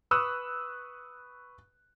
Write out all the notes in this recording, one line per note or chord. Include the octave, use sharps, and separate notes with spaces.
B4 C#6 D#6 E6 F#6 E7